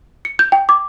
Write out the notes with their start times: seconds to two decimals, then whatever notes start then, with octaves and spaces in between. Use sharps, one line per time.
0.25 C#7
0.39 G6
0.52 G5
0.69 D6